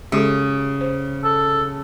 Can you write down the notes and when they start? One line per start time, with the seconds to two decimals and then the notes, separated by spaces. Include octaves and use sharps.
0.12 C#3 G#3 G4 A4
0.81 C5
1.24 A4